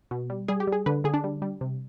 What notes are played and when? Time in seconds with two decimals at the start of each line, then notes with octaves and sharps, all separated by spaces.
0.11 B2
0.30 G3
0.48 G3 G#4
0.60 G4
0.67 G3
0.72 G#4
0.86 D3 B4
1.04 D3 G#4
1.14 D4
1.24 G3
1.42 G3
1.61 C3